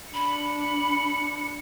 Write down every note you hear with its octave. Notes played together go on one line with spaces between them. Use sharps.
D4 B5 C#7